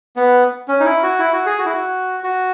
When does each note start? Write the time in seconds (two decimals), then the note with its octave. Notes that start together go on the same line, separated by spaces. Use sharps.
0.16 B3
0.68 C#4
0.80 D#4
0.85 E4
1.03 F#4
1.19 E4
1.33 F#4
1.46 G#4
1.58 F#4
1.66 E4
1.73 F#4
2.24 F#4